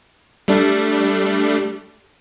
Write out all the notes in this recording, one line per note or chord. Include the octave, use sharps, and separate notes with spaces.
G3 A3 D4